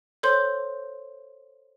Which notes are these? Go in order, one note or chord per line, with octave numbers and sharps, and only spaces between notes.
A4 C5 C#5 C6 G6